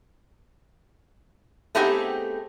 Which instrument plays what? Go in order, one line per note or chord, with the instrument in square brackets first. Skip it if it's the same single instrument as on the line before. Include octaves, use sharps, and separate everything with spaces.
[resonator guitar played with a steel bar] A3 B3 C4 D#4 G4 G#4